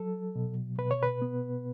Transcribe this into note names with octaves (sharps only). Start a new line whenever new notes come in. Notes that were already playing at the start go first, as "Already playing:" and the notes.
Already playing: F#3 A4
B2
B2 B4
C#5
B4
B3